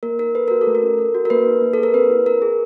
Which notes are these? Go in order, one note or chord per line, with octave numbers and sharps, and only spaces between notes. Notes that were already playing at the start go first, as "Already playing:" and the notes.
A#3 A#4
D#4 A#4
A4 B4
F#4 A#4
A4
A3
A#4
C#4
A4
F#4
A#4
A#3 B4
D#4
A#3
G#4 A4
A#4
C4 B4
E4
C4 A#4
G#4